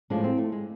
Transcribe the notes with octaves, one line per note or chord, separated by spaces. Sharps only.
A2 F3 G#3 D4
C4
A3
G#3